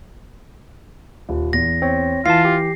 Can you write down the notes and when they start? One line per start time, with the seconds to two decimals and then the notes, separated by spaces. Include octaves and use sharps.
1.29 D#1
1.53 E2 A#6
1.82 C4 C#5
2.26 E3 F4 F5 A5 C7
2.45 G4